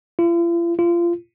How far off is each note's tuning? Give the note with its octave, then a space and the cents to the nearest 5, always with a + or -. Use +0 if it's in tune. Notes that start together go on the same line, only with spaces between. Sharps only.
F4 -45
F4 -25